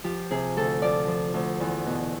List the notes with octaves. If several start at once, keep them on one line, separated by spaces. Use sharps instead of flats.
F3 G4
C3 G#4
D2 A4
F3 D5
F3
D2
E2
B2